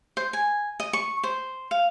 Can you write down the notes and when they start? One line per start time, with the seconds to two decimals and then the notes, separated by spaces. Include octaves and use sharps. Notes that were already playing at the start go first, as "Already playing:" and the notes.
0.17 C5
0.33 G#5
0.80 D#5
0.93 C#6
1.23 C5
1.71 F5